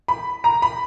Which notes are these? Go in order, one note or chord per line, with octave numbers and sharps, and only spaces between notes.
B5
A#5
B5